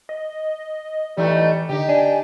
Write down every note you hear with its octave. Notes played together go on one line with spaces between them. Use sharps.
D#5
A2 E3 G3 A3 D#4
D3 D#4 G4
D4 G#5